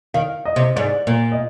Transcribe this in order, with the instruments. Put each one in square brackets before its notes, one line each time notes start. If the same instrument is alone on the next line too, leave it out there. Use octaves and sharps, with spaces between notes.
[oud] D#3 [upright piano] F5
[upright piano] D#5
[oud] C3
[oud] G#2 [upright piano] D5
[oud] A#2
[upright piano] D#5